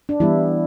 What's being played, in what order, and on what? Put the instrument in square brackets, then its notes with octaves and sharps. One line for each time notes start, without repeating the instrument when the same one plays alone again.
[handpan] D4
E3 G3 B3 E4